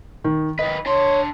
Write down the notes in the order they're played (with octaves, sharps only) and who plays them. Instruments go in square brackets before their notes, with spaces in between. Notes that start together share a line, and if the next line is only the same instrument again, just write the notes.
[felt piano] D#3
[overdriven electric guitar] D#3 B4 [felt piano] D#5
[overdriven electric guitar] D4 C6 [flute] C#5